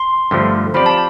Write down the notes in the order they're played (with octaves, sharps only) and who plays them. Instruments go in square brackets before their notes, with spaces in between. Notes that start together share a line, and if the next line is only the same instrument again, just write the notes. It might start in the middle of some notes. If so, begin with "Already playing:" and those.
Already playing: [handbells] C6
[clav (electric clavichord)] G2 D3 F3 A3
[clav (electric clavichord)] F3 C4 G4 D5 [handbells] B5
[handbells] A5